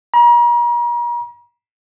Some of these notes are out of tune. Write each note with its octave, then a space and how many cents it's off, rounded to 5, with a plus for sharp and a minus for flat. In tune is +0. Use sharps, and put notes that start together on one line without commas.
A#5 +40